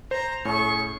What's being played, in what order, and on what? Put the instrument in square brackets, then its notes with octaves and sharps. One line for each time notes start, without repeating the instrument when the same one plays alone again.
[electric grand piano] C5 [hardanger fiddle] A#5
[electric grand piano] A2 [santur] C#4 G#4 [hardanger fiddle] C#6